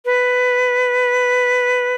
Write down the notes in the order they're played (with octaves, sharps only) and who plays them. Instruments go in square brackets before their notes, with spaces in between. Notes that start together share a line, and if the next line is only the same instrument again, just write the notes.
[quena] B4